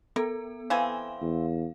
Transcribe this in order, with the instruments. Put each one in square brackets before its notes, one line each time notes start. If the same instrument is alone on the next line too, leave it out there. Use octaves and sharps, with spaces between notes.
[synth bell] B3 A4 [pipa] A#4
[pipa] E3 C4 G#5 [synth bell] F5
[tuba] E2